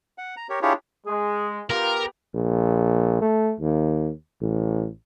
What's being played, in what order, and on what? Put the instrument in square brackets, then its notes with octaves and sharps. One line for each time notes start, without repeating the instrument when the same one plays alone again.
[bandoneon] F#5
A#5
G4 A#4 C#5
D4 E4 F4 G4 G#4 C#5
[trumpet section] G#3 [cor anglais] G#4
[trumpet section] B3 G4 [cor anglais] F4 [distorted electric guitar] A#4
[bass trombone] A#1
A3
D#2
A1